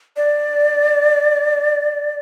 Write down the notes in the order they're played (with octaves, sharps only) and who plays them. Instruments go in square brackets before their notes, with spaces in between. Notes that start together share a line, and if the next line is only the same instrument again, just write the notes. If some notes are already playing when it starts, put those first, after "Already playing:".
[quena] D5